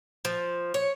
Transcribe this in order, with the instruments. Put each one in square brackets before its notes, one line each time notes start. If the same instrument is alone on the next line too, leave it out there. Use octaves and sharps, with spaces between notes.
[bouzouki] F3
C#5